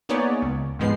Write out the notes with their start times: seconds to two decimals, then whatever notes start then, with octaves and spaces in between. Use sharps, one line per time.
0.09 A#3 B3 D#4 G#4 C#5 D5
0.42 C#2
0.79 D#2 G#2 F3 G#3 B3 C7